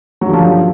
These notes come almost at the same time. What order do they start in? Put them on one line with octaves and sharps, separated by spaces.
F#3 G2 D3 F3